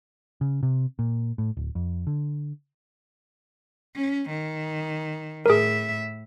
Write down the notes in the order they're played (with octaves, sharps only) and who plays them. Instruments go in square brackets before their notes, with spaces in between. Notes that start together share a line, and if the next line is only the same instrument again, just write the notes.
[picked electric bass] C#3
C3
A#2
A2
D1
F2
D3
[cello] C#4
D#3
[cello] A2 E5 [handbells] G#4 A#4